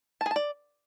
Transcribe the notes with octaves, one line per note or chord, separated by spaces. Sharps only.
A5
G#4
A5
D5